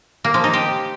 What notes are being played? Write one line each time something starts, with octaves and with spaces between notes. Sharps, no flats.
A#3
F3
D#4
G4